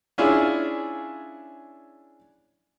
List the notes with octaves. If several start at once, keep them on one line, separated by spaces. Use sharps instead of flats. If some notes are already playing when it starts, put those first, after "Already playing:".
C#4 D4 E4 F4 G#4